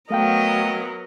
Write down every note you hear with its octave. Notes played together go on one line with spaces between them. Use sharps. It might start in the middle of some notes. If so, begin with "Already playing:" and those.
F#3 A3 B3 A#4 D#5 F5 G5